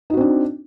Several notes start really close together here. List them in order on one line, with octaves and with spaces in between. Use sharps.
D#4 F#4 C4 D4